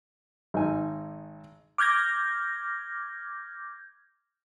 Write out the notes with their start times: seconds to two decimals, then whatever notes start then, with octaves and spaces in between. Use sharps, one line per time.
0.54 G#1 D#4 G#5
1.78 D6 F6 G6 G#6 A#6